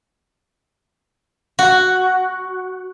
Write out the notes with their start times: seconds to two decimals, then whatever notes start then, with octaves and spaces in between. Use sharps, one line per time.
1.59 F#4